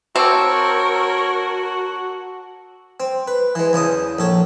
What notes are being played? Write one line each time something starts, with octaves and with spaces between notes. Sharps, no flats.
C4 F#4 A#4 C#5 A5 D6 E6
C4
B4
E3 G#3
E2 C#3 A5 D#6
A#1 A4 C#5